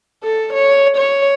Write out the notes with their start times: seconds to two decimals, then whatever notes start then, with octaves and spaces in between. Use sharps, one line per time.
0.23 A4
0.53 C#5
0.97 C#5